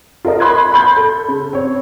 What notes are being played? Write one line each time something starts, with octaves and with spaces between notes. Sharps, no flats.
F4 A4 A#4 D#5
B5 C6 F#6 G#6
B5 C6 G6
A4
C#3
C4 C#5